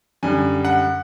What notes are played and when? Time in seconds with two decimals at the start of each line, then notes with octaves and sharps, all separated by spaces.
0.23 F#2 D3 G3 G#5
0.65 F#5